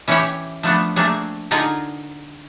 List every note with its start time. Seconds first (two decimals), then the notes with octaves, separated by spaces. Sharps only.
0.08 E3 C#4 E4 G4 C#5 G5
0.63 F3 A3 B3 D4
0.96 A3 A#3 C4 D4 G#4
1.51 D3 D#4 F4 G#4 A#4